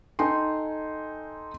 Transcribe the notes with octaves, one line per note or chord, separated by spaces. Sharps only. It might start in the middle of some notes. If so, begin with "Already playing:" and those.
D#4 A4 G5 G#5 C6